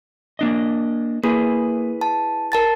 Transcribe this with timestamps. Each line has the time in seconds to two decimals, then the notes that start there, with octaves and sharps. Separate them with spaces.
0.39 A#3 D4 D#5
1.24 A#3 E4 G#4 B4
2.01 A5
2.52 A#4 A5 A6